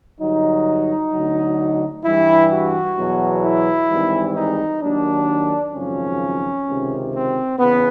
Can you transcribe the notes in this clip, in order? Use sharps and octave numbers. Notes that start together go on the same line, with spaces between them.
G2 D3 F#3 D#4
D2 D3 F#3
G2 E3 G3 E4
F#4
E2 B2 F#3
E4
G#1 G#2 E3 G3
D#4
D#2 D#3 F#3 D4
G#1 F#2 C#3 F3 C#4
C#2 C3 D#3
C4
E2 C#3 B3